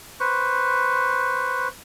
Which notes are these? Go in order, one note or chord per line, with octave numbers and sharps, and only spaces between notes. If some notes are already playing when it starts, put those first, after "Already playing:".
B4 C5 C#6